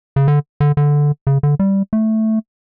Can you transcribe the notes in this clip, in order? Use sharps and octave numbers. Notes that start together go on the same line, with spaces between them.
C#3
D3
D3
D3
C#3
D3
G3
A3